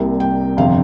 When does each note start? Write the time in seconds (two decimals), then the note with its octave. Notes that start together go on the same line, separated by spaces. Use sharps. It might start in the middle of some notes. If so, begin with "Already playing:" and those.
Already playing: C2 C3 G3 A#3
0.20 G5
0.57 G1 F2 C3 F5